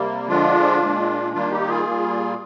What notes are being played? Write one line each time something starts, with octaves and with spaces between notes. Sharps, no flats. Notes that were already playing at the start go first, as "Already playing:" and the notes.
Already playing: C3 G3 A#3
D3 F3 G#3 D4 F4
A#2 G#3
D#3 G3 A#3 D4 F4
D#4 G4
F4 G#4
A#2 G3 A#3